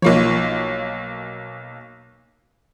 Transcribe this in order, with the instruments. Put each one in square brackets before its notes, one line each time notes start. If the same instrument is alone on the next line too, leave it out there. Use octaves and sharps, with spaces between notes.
[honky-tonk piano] B1 A#3 C#5 [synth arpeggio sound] F3 F4